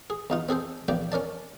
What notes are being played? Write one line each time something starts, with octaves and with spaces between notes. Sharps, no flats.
G#4
E2 D#4 F4
C4 G#4 A4 C5
A#1 E2 F3 D5 G5
C#4 A#4 D5 A5